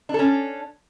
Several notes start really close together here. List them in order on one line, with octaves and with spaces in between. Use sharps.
D4 A4 C#4